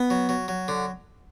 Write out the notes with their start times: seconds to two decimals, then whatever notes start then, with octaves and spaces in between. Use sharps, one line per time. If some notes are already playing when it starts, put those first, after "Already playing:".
Already playing: B3
0.10 F#3
0.29 F#3
0.48 F#3
0.68 D3